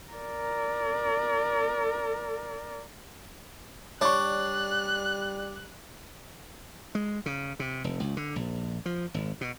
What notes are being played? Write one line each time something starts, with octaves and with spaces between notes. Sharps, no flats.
A#4 D5
G3 D4 C#5 C#6 F#6
G#3
C#3
C3
F1
C#2
D3
A#1
F3
G#1
B2